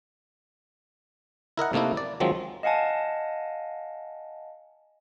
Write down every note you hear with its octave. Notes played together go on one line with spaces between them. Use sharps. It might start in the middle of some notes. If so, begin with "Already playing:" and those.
E4 A#4 D#5 F#5
C3 A3 A#3 D#4 E4
D5
D#3 F3 F#3 G#3 C4
D#5 F5 F#5 G#5 A5